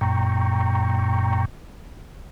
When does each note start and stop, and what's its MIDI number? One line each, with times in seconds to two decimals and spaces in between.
0.01 1.45 42
0.01 1.45 46
0.01 1.45 79
0.01 1.45 82
0.01 1.45 85